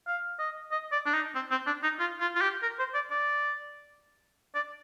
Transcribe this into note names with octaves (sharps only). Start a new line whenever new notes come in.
F5
D#5
D#5
D5
D4
D#4
C4
C4
D4
D#4
F4
F4
F4
G4
A#4
C5
D5
D5
D5